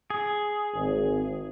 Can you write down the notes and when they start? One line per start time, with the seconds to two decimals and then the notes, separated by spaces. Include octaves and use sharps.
0.10 G#4
0.74 G#1